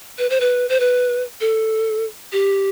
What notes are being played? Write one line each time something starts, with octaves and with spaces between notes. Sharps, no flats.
B4
C5
B4
C5
B4
A4
G4